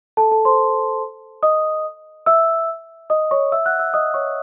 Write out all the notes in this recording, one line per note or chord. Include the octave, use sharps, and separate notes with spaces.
A4 A5
A4 A5
C5 C6
D#5 D#6
E5 E6
D#5 D#6
C#5 C#6
E5 E6
F#5 F#6
E5 E6
D#5 D#6
C#5 C#6